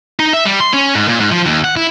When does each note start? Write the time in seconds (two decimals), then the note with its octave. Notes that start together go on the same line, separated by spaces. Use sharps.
0.20 D#4
0.33 E5
0.45 G3
0.60 C6
0.73 C#4
0.95 G#2
1.08 A#2
1.20 G#2
1.32 F3
1.46 D#2
1.64 F#5
1.77 E4